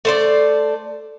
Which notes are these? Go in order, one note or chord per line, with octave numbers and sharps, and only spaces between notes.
A3 C5 D5